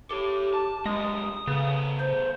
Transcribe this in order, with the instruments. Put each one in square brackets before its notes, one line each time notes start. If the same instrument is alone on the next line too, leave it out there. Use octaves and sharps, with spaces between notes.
[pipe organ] G4 [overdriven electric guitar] A4 C#5
[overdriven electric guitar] A5
[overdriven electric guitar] F#2 G3 [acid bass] G#3 [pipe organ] D#6
[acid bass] C#3 [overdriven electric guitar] A3 B3
[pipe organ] C5